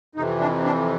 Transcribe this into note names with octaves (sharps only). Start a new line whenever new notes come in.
F2 C3 E3 D#4
D4
D4